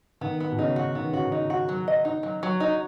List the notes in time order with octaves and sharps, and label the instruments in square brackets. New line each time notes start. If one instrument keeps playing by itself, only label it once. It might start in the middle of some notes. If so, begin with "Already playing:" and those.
[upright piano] D#3 [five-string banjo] B3
[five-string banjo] B3
[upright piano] B2
[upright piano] C#3 [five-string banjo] D#4
[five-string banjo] F#4
[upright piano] D#3 [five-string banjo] B3
[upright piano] C#3 [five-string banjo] F#4
[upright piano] D#3
[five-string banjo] D#4
F#4
F#3
D#5
D#4
F#3
F#3
D#4